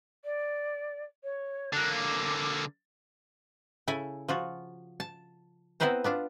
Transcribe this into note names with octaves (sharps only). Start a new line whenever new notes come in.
D5
C#5
D3 A#3 F#6
D6
C#3 E4 A4 G#5
F3 F4 F#4
A5
B3 C4 E4 B4 C5 A#5
B3 D4 F4